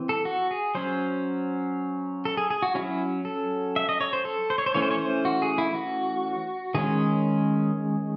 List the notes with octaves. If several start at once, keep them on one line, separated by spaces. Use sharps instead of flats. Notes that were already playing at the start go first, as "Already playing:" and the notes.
Already playing: E3 C4
A4
F#4
G#4
F#3 C#4 C5
A4
G#4
G#4
F#4
F#3 C#4 E4
A4
E5
D#5
C#5
C5
A4
C5
C#5
C5
E3 A3 C#4 C#5
C5
C#5
C5
F#4
G#4
E4
F#4
D#3 G#3 C#4 G#4